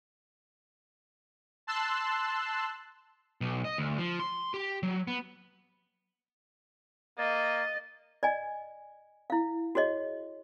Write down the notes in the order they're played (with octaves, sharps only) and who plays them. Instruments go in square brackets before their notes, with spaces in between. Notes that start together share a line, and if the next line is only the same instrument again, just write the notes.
[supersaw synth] A5 C6 E6 F#6
[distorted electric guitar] B1
D#5
D2
F3
C6
G4
F#3
B3
[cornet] A#3 [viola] D#5 [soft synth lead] A6
[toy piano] D5 D#5 G#5
E4 F5
F#4 G#4 C#5 D#5